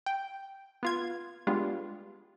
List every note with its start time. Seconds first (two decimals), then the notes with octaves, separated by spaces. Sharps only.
0.06 G5
0.83 B3 F4 G#6
1.47 G3 G#3 B3 D4 F4